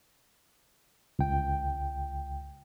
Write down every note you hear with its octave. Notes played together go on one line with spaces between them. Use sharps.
C#2 G5